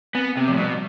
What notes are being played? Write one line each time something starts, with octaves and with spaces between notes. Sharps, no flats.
B3 C4
C3 B3
A2 F3
B2 G3